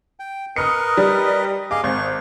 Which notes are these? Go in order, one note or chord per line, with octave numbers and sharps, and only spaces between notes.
G5
A#4 B4 D#5 D#6 F6 C#7
G3
G#4 D#5 F5 D6
G#1 C#6